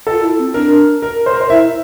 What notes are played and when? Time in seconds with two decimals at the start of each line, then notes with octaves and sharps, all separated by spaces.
0.07 F4 A4
0.23 E4
0.39 C4
0.54 D4 A#4
1.02 A#4
1.26 C5
1.33 A#4
1.41 C5
1.50 E4 E5